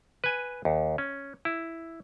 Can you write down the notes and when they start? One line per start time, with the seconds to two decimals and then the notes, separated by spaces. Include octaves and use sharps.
0.24 B4 G#5
0.65 D#2
0.98 C#4
1.45 E4